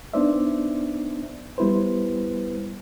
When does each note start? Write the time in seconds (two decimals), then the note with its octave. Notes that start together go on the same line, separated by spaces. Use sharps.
0.14 B3 D4 D#4 C5 D5 E5
1.58 G3 B3 E4 B4 C5